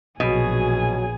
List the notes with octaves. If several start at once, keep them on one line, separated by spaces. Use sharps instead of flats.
A#1 B2 F#3 G#4 G#5